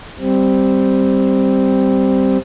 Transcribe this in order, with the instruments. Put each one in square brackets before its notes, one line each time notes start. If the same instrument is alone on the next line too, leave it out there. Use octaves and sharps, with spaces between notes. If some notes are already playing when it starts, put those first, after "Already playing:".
[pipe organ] G3 C4